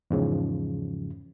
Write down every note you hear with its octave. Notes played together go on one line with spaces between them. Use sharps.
E2 G#2 C#3 F3